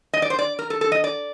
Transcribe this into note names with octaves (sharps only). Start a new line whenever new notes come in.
D#5
D5
C5
D5
A#4
A4
A4
D#5
D5